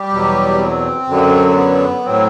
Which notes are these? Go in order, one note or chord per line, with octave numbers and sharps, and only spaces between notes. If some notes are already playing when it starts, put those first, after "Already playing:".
Already playing: G3 G4
E2 B2 F#3
B3
C4
F#2 D3 F#3
C4
B3
A2 F#3 C4